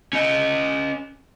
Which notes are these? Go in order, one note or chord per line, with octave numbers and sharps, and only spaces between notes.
C#4 D#5